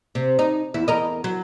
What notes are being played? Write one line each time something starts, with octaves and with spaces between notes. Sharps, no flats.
C3
D#4
E2 E4
E2 A#4 D#5
F#3